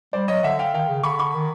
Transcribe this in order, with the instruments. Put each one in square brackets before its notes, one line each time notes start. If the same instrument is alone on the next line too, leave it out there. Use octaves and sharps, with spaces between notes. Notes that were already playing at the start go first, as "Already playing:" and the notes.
[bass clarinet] G3 [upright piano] C5 D5
[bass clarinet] F#3 [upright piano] C#5 D#5
[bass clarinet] D3 [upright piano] E5 F#5
[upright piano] F5 G5
[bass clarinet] D#3 [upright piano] F5 G5
[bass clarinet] C#3
[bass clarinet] D3 [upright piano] B5 C#6
[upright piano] B5 C#6
[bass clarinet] D#3